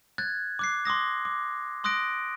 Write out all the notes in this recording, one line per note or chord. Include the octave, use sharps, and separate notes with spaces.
F#6 G#6 A6
D6 F#6 C7
C6 D6 D#6 A#6
D6
C6 D#6 F#6 A#6 D7